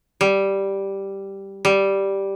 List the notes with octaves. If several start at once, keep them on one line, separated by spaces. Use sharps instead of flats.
G3
G3